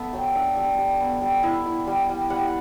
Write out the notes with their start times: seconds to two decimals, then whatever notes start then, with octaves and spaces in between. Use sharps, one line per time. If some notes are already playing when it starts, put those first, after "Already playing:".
Already playing: B3 A4 E5
0.13 F#3 G5
0.35 D4 E5
0.56 G3 E5
0.78 G3
1.00 B3
1.21 G3
1.43 E4
1.66 E4
1.87 G3
2.09 G3
2.30 G3 F#5